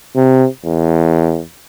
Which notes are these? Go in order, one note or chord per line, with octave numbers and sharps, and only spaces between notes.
C3
E2